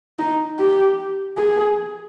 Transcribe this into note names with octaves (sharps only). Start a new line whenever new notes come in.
D#4
G4
G#4